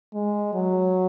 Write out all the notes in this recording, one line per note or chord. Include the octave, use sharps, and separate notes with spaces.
G#3
F#3